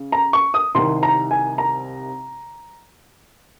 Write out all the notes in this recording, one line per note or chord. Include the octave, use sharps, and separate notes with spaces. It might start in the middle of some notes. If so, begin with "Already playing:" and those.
Already playing: C#3
A#5
C#6
D#6
C2 C3 D#3 C6
A#5
G#5
A#5